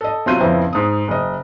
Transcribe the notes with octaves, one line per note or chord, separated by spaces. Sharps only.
A4 D#5
C3 F#3 F4 C6 G6 D#7
F2 C#3 B3 C4 E4
G#2 D#6
F#1 D#5